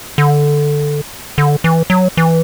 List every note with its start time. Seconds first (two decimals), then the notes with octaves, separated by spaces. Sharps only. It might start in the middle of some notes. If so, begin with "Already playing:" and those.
0.18 D3
1.38 D3
1.64 E3
1.90 F#3
2.17 E3